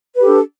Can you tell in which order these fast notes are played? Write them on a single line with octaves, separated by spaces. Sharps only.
B4 G4 A4 D4